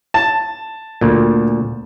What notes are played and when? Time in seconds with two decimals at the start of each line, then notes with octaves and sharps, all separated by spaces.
0.14 A5
1.01 D2 A#2